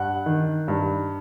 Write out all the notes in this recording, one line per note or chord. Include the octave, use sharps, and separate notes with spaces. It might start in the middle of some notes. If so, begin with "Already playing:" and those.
Already playing: G2 F#5 F#6
D#3
G2